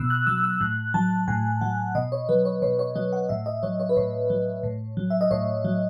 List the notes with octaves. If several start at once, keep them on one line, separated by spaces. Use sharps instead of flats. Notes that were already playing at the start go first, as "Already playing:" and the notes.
Already playing: B2 E6 F#6
F#6
F#3 E6
E6
A2 F#6
F#3 A5
A2 G#5
F#3 F#5
B2 D#5
C#5
F#3 B4
C#5
B2 C#5
C#5
F#3 D#5
F#5
A2 E5
D#5
F#3 C#5
C#5
B4
A2 C#5
F#3
A2
F#3
E5
D#5
A2 C#5
F#3